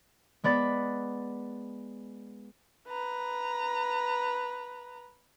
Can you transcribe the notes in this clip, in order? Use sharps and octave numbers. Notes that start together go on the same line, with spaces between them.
G#3 B3 D5 B5 A6
B4 A#5